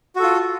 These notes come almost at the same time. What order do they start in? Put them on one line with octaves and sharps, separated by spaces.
F#4 A4 F4